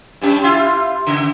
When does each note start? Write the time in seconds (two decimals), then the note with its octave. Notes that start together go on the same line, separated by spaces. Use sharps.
0.21 G2 G3 C#4
0.44 E4 F4 G4
1.07 C#3